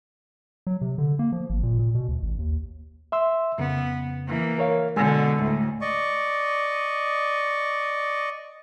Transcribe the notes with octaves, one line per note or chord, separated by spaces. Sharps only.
F#3
C3
D3
A#3
F3
G#1
A#2
A#2
B2
D2
A1
D#2
E5 C6 E6
F2 C#3 B3
E3 A#3
A#4 C#5 F5
B2 D3 G#3 G#5 E6
D2 A2
D5 D#5 C#6